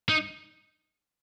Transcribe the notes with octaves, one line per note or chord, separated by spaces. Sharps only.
D#4